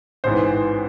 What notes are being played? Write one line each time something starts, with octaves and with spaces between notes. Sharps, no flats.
A1 G#2 E3 C5